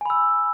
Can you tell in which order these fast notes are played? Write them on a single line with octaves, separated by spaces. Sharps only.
G#5 B5 E6